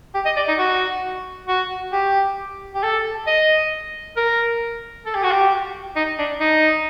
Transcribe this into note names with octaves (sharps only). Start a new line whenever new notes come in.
G4
D#5
D5
D#4
F#4
F#4
G4
G4
A4
D#5
A#4
A4
G4
F#4
G4
D#4
D4
D#4